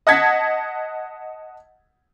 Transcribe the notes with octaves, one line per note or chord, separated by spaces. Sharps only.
D#5 F#5 A5 G#6 B6